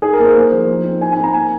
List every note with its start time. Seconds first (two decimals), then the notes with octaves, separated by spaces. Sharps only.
0.02 D#4 G#4
0.13 A#4
0.19 A#3
0.25 C5
0.36 A#3
0.52 F3
0.68 D#4
0.84 C4
1.01 D#4 G#5
1.12 G#5
1.17 C4
1.23 A#5
1.34 A#3 G#5